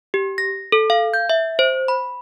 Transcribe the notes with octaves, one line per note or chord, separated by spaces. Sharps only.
G4
A#6
A4
F5
G6
E5
C5
B5